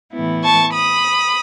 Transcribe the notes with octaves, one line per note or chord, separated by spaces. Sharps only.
A2 E3 B3 E4
A5 C#6
B5 D#6